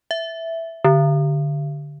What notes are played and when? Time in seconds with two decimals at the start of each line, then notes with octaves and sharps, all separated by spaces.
0.11 E5
0.84 D3